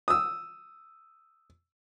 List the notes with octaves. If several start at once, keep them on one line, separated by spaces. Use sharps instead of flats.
D#6 E6